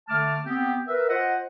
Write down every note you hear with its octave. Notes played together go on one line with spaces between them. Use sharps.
D3 A3 A5 D6 F6
B3 C4 G4
A#4 B4 E5
F4 C5 D#5 F#5